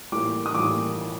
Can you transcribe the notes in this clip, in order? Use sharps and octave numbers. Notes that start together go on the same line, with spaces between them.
A2 E3 G3 A#3 D6
D#6
A2 E3 G3 A#3 D6